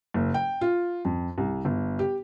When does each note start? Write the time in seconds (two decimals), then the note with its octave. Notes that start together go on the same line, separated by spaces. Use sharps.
0.14 F#1
0.34 G5
0.61 F4
1.05 F2
1.38 C2
1.65 G1
1.99 G4